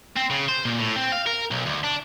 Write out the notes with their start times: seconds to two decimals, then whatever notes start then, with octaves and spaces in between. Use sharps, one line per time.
0.17 C4
0.30 C#3
0.48 C5
0.65 A#2
0.79 A2
0.96 C4
1.12 F5
1.27 A#4
1.51 B1
1.66 D2
1.84 D4